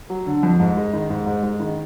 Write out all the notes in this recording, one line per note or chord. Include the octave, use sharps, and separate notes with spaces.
F#3
D3
F2
G#2
G#3
D#3
G#2
G#2
G#3
D#3